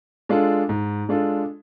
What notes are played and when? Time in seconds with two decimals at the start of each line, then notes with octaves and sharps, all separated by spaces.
0.29 G#3 D4 F4 A4
0.69 G#2
1.09 G#3 D4 F4 A4